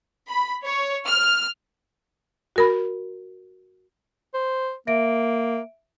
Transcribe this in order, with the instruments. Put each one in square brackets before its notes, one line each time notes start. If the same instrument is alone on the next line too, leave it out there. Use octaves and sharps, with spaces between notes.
[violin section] B5
C#5
F6
[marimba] F#4 A#4 B5
[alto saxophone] C5
[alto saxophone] A#3 [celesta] E5 D7